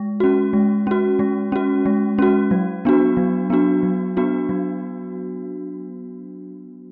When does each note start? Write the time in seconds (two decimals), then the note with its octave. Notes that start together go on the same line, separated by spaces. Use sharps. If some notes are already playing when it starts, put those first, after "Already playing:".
Already playing: G#3
0.20 C#4 F#4
0.53 G#3
0.87 C#4 F#4
1.19 G#3
1.52 C#4 F#4
1.86 G#3
2.19 C#4 F#4
2.51 F#3
2.85 B3 D4 F#4
3.17 F#3
3.50 B3 D4 F#4
3.83 F#3
4.17 B3 D4 F#4
4.49 F#3